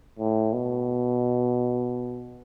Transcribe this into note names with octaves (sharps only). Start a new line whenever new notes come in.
A2
B2